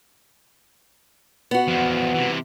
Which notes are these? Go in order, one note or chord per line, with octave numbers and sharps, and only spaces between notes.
B3 F#4
E2 F3
C3 E3